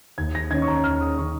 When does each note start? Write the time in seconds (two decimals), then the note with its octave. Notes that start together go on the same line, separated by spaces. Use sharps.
0.18 D#2 G#6
0.35 A#6
0.51 D#3 C#4 G#6
0.62 C#6
0.68 A#5
0.84 D#2 F6
1.01 D#6
1.17 D#3 C#4 C#6